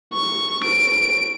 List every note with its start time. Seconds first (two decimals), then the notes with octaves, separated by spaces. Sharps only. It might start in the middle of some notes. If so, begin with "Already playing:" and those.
0.13 C#6
0.64 D7